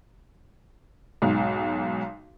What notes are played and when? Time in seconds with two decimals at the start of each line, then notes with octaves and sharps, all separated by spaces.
1.22 B1 G#2